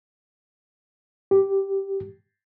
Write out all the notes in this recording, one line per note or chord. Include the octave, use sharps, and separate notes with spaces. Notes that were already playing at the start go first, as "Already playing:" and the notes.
G4